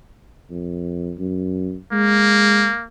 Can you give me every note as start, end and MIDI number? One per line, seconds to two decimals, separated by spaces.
0.50 1.13 41
1.18 1.76 42
1.92 2.71 56
1.92 2.86 58